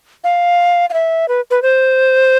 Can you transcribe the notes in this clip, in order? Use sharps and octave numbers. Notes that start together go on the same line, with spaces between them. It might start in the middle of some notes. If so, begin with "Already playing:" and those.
F5
F5
E5
B4
B4
C5